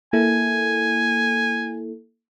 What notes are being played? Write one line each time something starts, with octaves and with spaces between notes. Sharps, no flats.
A#3 E4 A4 G#5